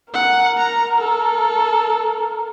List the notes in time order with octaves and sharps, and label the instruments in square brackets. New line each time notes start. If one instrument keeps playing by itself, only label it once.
[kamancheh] A#4 [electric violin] F#5
[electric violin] A#5
A4